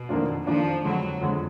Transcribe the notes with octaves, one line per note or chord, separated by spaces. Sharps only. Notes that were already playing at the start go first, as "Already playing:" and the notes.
Already playing: B2
F2 D#3 A#3 D4 F4
F2 D#3 F3 A#3 D4 F4
F2 D3 F#3 G#3
F2 D3 G#3